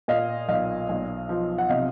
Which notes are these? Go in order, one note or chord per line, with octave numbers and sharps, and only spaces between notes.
A#2 D#5 F5
B1 D#5 F5
B1
F3
F#5
C3 D#5 F5